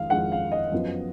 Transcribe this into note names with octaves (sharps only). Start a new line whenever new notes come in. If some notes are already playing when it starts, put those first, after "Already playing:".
Already playing: F2 D#3 G#3 F5
F2 D#3 G#3 F#5
F5
D#5
F#2 F3 B3